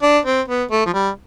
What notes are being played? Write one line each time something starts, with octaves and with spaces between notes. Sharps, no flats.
D4
C4
B3
A3
F3
G3